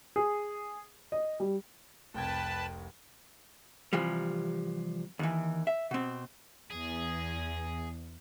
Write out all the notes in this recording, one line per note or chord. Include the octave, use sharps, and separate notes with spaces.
G#4
D#5
G3
F1 C2 B4 G5 A5 G#6
C3 E3 F3 G3
D#2 E3
E5
B2 C4
E2 G#4